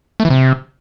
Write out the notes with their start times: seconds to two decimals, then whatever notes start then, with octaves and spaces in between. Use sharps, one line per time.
0.20 A3
0.25 E3
0.30 C3